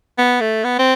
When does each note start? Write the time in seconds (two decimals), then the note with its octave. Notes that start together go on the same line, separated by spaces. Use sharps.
0.19 B3
0.41 A3
0.64 B3
0.79 C4